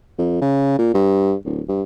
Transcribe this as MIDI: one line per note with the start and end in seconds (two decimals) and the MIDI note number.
0.18 0.37 41
0.41 0.74 49
0.78 0.90 46
0.94 1.34 43
1.45 1.61 26
1.68 1.82 43